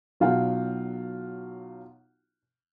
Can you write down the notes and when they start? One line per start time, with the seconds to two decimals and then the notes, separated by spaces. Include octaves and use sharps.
0.20 B1 F#3 F4 F#4 F#5 G5